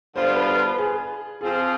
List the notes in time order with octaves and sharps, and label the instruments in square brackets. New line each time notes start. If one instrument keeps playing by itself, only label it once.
[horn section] D3 G3 B3 F4 [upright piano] C5
[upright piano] B4
B4
G#4
[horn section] F3 C4 F4 [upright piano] G#4